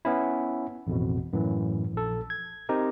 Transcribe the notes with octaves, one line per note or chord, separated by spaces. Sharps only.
B3 C#4 E4
A1 F2 B2
F#2 A2 E3
A#1 A4
G#6
C4 D#4 G4 A#4